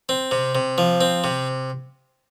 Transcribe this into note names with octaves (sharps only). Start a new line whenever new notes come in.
C4
C3
C3
F3
C4
C3